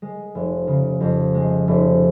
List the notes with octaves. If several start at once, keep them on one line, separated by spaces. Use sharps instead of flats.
G#3
F1
C#3
F2
G#3
F1